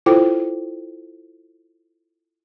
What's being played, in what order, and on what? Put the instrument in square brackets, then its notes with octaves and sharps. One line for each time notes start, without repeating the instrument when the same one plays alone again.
[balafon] E4 F4 A4 C5 G5 D6